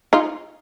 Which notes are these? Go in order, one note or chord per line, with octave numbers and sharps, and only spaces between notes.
D#4 F4